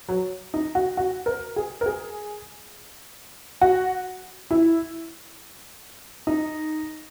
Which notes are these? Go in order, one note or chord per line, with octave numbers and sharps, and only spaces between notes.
F#3
D#4
F#4
F#4
A#4
G#4
A#4
G#4
F#4
E4
D#4